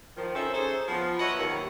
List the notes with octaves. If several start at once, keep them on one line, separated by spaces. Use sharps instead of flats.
D#3 F3
C4 C#4 D#4 A4 C5 E5
C#4 D#4 G#4 A4 C5
F3 B3
F#3 B4 C#5 D#5 E5 F#5
D#2